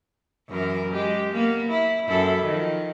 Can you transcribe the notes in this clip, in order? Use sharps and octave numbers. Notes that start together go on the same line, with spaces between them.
F#2 E3 A#4
G#3 G4
A#3 B3
E4
F#2 E4 A4
D#3 F3